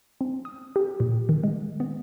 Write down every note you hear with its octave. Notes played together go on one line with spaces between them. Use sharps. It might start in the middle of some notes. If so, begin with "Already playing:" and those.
C4
D#6
G4
A#2
D#3
G#3
B3